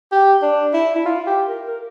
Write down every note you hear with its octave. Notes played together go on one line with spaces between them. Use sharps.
G4
D4
E4
E4
F4
G4
A#4
A#4